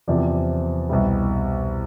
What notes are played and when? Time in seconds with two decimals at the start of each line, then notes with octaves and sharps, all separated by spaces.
0.08 E2 C3 F3 D5
0.89 C2 B2 G3 E5